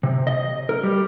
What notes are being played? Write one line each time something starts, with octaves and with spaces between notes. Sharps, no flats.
C3
D#5
A#4
G3